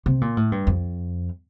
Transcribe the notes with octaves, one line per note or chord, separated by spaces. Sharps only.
C3
A#2
A2
G2
F2